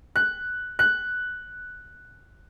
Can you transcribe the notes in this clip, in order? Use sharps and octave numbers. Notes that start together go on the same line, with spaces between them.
F#6
F#6